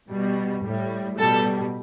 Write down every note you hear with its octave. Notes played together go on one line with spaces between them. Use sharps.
B2 G3
A2 G3
B2 G3 A4